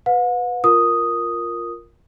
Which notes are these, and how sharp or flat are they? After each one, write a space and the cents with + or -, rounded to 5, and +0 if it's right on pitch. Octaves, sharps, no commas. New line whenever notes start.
B4 +10 F#5 -45
F4 +0 A#4 +0 D#6 +0